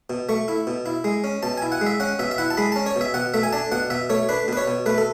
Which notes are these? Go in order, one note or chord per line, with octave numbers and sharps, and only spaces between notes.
B2
A3 C#6
E4
B2
E4
G#3
C#4
B2 A5
E4 G#5
F#5
G#3
E5
C#4 F#5
B2 E5
E5
E4 F#5
A5
G#3 B5
C#4 A5
C#5
B2 E5
B2 F#5
A3 E5
G#5
D4 A5
B2 F#5
B2 E5
A3 C#5
D4 B4
B2 B4
C#5
B2
A3 B4
A4